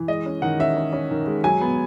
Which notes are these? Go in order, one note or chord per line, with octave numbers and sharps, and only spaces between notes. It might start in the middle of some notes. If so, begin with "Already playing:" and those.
Already playing: E3
G#3 D#5
C#4
D#3 F#5
C#4 E5
C#4
C#4
D#3
G#3
F#3 G#5
B3